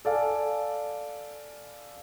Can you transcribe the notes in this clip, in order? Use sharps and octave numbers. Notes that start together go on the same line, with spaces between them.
A4 D5 F5 G#5